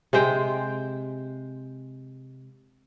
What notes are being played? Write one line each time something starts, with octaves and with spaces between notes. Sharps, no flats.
C3 G#3 C5 G5